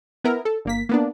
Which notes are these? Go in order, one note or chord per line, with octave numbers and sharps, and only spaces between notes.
B3 E4 A#4
A4
G1 A#3 B6
A#3 B3 D4